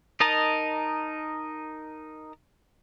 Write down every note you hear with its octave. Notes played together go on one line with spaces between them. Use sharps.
D#4 A#4 D#5 A5 A#5